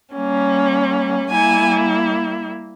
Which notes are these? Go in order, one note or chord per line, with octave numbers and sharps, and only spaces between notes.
G3 A#3 C#4
G3 A#3 E4 G#5